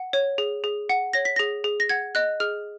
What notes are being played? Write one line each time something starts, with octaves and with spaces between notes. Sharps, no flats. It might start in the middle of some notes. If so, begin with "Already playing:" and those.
Already playing: F#5
C#5
G#4
G#4
F#5
C#5 A#6
B6
G#4 A#6
G#4
A#6
F#5 G#6
D#5 F#6
G#4 F6